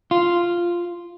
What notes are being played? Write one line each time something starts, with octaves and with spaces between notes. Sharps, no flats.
F4